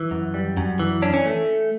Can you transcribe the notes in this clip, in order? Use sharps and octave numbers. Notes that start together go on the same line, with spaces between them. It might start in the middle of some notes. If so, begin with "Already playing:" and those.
Already playing: E3
F#2
G3
F#2
E3
C#4 D4
C#4
A3